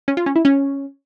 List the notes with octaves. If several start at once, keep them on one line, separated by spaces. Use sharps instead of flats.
C#4
F4
C#4
E4
C#4